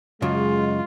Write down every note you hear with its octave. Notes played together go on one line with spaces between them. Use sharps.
F#2 C#3 G#3 F4